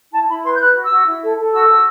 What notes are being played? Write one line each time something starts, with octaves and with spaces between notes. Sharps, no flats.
E4 A5
E4 B5
B4 C6
G6
B4 F#6
F#4
E6
F#4
E4
A4
A4
F#4 E6
F#4